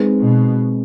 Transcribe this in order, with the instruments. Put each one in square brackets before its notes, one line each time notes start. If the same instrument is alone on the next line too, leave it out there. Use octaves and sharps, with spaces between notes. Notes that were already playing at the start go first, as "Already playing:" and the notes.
Already playing: [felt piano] G#3 C4 D#4 G#4 B4
[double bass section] B2